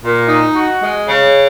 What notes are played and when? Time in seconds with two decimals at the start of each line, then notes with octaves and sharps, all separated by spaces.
0.02 A#2
0.28 D#4
0.54 F#4
0.82 G#3
1.08 C#3